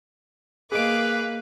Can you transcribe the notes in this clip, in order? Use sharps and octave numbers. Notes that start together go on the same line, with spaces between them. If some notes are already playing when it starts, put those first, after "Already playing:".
A#3 G#4 B4 D#5 F5 D6 D7